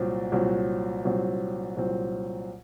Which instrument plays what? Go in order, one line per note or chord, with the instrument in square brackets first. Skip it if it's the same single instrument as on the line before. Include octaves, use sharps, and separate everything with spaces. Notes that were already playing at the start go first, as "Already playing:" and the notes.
Already playing: [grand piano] C2 A#2 F#3 C4
C2 A#2 F#3 C4
C2 A#2 F#3 C4
C2 A#2 F#3 C4